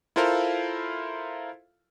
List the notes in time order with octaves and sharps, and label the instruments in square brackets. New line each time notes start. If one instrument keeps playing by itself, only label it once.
[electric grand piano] E4 F4 A4 A#4 C5 F5